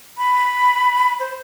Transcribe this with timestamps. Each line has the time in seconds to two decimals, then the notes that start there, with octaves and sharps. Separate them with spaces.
0.18 B5
1.20 C5